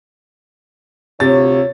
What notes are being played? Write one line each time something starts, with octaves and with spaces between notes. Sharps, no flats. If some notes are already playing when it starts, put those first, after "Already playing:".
D2 C3 F4 C#5 A6